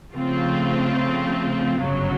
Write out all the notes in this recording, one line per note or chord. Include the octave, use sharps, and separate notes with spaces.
C#3 F3 A3 C4 F4
G1 F#2 C#3 F#3